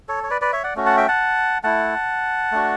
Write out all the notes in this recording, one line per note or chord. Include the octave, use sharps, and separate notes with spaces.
A4 C#5
C#5
B4 D5
B4 D5
C#5 E5
D5 F#5
A3 C#4 F#4
F#5 A5
E5 G5
F#5 A5
A3 E4 F#5 A5
A3 D4 F#4